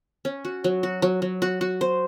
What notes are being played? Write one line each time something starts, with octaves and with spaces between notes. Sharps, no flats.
C#4
F#4
F#3
F#4
F#3
F#3
F#4
F#4
C5